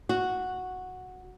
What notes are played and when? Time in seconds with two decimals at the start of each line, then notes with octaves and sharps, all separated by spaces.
0.09 F#4